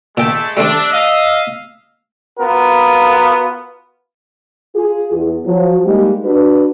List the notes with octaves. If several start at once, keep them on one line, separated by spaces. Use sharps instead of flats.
A#2 G#3 A3 E5 G5 A5
G3 A3 C4 D4 E5
D#5 F5
B3 F4 F#4 A#4
F4 G#4
E2
F3 F#3
G3 G#3 A#3 D#4 G4
D4 F#4 B4